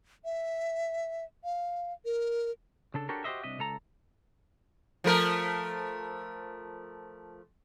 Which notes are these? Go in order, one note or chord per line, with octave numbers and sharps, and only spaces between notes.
E5
F5
A#4
C#3 D4 A4
D4 F#4 G4 A4 A#4 C#5
F#4 G4 B4 C5 D#5 E5
C2 C3 D4 D#5 E5
C#2 A4 A#5
F3 A3 A#4